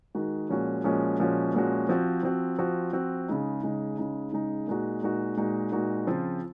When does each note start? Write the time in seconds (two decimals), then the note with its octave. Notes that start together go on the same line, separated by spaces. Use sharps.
0.15 D#3 G#3 D#4 F#4
0.49 A#2 F3 G#3 C#4 F#4
0.84 A#2 F3 G#3 C#4 F#4
1.20 A#2 F3 G#3 C#4 F#4
1.54 A#2 F3 G#3 C#4 F#4
1.89 F3 C4 F#4
2.23 F3 C4 F#4
2.59 F3 C4 F#4
2.93 F3 C4 F#4
3.28 C#3 G#3 D#4
3.63 C#3 G#3 D#4
3.98 C#3 G#3 D#4
4.32 C#3 G#3 D#4
4.67 A#2 G#3 D#4 F#4
5.02 A#2 G#3 D#4 F#4
5.37 A#2 G#3 D#4 F#4
5.72 A#2 G#3 D#4 F#4
6.07 C#3 F3 C4 F4